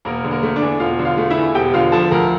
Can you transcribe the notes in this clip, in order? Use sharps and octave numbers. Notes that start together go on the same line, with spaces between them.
E1 A#3 A#4
D3
A#3 A#4
A3
D4 D5
E2
E1 F4 F5
D3
F4 F5
A3
E4 E5
E2
E1 G4 G5
D3 F4 F5
F3 A4 A5
D2 A#4 A#5